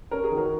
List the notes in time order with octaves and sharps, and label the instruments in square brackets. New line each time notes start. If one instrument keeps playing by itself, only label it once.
[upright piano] C#4 A#4
G#4
D#3
F#4 A#4